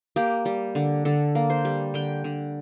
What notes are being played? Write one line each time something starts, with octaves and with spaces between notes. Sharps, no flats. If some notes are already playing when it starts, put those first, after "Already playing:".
A#3 G4
G3
D3
D3 A4
A#3
C5
G3
D3 G5
D3